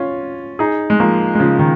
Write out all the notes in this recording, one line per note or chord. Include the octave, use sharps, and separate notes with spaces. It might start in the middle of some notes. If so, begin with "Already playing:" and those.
Already playing: C#4 F4
D#4 G#4
G#3
F3 A#3
G#3
C#3 F3
D#3